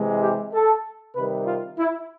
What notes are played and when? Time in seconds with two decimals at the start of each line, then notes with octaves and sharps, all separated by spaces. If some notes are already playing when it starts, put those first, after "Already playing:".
Already playing: C3 E3 G#3
0.21 G4
0.54 A4
1.16 C3 D#3 G3 B4
1.46 F4
1.78 E4